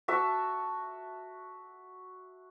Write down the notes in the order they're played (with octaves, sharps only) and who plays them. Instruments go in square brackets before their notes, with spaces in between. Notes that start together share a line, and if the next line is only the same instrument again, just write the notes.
[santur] F#4 E5 A5